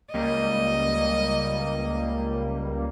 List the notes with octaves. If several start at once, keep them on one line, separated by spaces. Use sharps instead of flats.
C#2 G3 A#3 D#5